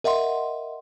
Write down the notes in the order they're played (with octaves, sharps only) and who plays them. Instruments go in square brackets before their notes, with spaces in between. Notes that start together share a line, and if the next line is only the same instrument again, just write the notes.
[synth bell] A#4 D#5 E5 F#5 C6